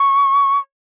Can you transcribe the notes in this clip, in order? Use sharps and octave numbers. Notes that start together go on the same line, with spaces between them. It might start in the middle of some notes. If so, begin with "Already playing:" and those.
Already playing: C#6